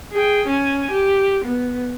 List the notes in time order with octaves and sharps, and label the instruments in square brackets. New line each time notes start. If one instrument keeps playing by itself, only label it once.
[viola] G#4 G5
C#4 G#5
G4
B3